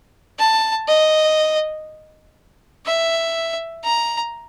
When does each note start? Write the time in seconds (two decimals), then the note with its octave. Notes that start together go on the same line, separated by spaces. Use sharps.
0.39 A5
0.88 D#5
2.85 E5
3.84 A#5